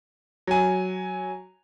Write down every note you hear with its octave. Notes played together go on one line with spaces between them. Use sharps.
F#3 G#5